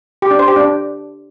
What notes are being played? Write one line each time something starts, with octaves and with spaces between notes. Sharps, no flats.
G4
D4
C5
G4
D4